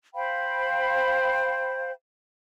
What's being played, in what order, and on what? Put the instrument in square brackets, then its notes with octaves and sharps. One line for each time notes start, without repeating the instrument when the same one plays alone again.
[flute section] C5 F5 G5 B5